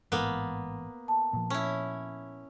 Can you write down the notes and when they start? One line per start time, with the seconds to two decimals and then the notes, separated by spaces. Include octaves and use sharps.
0.12 A1 G#2 E3 A#3 B3
1.08 A5
1.33 A#2 F3
1.50 C#4 E4